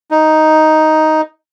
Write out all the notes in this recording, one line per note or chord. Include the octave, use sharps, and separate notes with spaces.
D#4